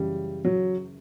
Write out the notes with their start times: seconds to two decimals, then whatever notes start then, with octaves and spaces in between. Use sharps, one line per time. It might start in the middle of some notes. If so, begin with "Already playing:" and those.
Already playing: F#2 C#3 E3 G3
0.45 F#3